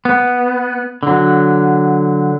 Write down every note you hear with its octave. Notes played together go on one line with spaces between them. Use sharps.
B3
D3 F#3